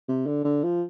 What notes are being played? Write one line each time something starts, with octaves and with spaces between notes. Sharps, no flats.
C3
D3
D3
F3